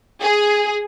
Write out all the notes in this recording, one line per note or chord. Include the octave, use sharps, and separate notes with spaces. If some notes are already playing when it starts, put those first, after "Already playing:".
G#4